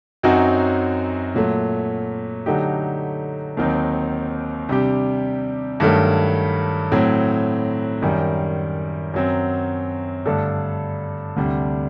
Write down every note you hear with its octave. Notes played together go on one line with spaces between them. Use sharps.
F#2 F#3 C4 D#4 F#4
A#2 F#3 A3
D3 F#3 A3 D#4 G4
D#2 D#3 F#3 C4 D#4
C3 G3 D4 G4
G2 D#3 F#3 A3
A2 F#3 C4
F#2 D#3 G3
F#2 F#3 C4
G2 D3 A3 D4 A4
D2 C3 G3 D4